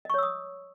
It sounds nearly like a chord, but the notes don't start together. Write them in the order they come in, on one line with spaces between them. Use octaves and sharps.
D#5 C#6 C#5 E6 D#6